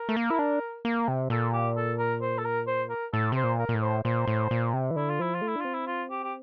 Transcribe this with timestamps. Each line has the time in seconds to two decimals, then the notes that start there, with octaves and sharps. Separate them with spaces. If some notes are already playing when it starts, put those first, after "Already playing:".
Already playing: A#4
0.09 A3
0.17 A#3
0.30 E4
0.39 D4
0.85 A#3
1.08 C3
1.30 A#2 A4
1.53 G4
1.77 A4
1.99 A#4
2.22 C5
2.38 A4
2.45 A#4
2.67 C5
2.90 A#4
3.13 A2 A4
3.32 C3 C5
3.44 A#2
3.59 A#4
3.69 A#2
3.74 A2
3.82 C5
4.05 A#2 C5
4.27 A2
4.51 A#2
4.73 C3
4.91 E3
4.96 D3 E4
5.09 F4
5.19 F3 E4
5.34 F4
5.42 A3
5.48 E4
5.56 D4
5.60 C4 F4
5.74 E4
5.87 F4
6.11 G4
6.24 G4